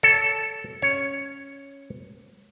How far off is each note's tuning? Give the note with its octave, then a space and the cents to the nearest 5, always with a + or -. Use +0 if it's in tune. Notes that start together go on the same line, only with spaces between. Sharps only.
A4 +0 C#5 +40
C#4 +0 C#5 +0